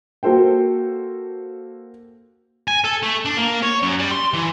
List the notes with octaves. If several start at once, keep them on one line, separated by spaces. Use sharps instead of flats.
A#3 F#4 A4 C5 G5
G#5
A4
A3
D4
A#3
C#5
F#2
G3
C6
E3